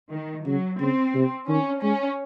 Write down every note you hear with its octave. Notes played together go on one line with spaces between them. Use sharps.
D#3
C#3 F#3
C#3 C4
C3
D#3 C#4
G#3 C#4